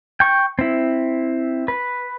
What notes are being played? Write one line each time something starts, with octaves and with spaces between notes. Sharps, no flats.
G5 C#6
C4 E4
B4